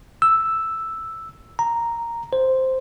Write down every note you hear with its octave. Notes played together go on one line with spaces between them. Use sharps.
E6
A#5
C5